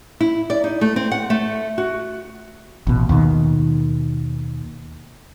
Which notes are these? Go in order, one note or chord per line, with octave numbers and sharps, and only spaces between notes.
E4
D5
D#4
A3
C4
F#5
A3
F#4
A1 B2
D#2 B2 D#3